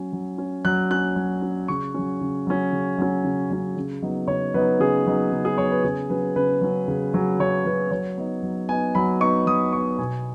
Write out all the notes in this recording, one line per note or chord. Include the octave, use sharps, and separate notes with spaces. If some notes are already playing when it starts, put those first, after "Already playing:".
Already playing: F#3 C#4
F#3
C#4
F#3 F#6
C#4 F#6
F#3
C#4
C#3 C#6
F#3 C#4
C#3
F#3 C#4
C#3
F#3 C#4
C#3
F#3 C#4
C#3
F#3 B3 D#4
C#3 C#5
F#3 B3 D#4 B4
C#3 G#4
F#3 B3 D#4
C#3
G#4
F#3 B3 D#4 C#5
B4
C#3 G#4
F#3 C#4 B4
C#3 B4
F#3 C#4
C#3
F#3 C#4
C#3 C#5
F#3 C#4 B4
F#3 C#5
B3 D#4
F#3
B3 D#4 G#5
F#3 B5
B3 D#4 C#6
F#3 D#6
B3 D#4 C#6
B2 G#5